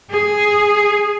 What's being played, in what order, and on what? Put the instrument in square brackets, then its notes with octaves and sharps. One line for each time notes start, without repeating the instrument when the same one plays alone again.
[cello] G#4